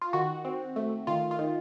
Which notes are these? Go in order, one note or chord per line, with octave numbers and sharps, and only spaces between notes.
F4
D#3 F#4
C4
A3
D#3 F4
F4
D#3